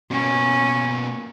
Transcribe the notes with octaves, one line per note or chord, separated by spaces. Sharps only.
B2 A#3 C#4